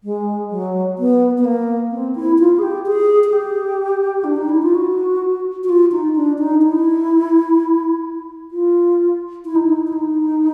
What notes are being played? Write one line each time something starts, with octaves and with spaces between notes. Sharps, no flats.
G#3
F#3
B3
B3
A#3
C4
E4
F4
G#4
G4
G#4
G#4
G4
D4
D#4
E4
F4
F#4
F#4
F4
D#4
D4
D#4
E4
F4
E4
D#4
E4
E4
D#4